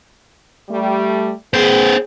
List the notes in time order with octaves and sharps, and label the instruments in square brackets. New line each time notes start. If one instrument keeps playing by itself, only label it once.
[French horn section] G3 A3
[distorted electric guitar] B3 C5 [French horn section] G#4